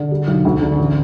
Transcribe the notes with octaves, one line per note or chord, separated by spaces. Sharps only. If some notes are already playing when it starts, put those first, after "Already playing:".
Already playing: D3
G3
B1
D2
D3
A1